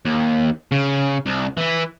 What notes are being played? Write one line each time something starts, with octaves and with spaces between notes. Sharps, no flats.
D#2
C#3
C2
E3 E4